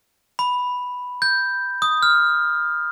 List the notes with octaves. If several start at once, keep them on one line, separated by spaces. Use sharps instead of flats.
B5
G6
D#6
F6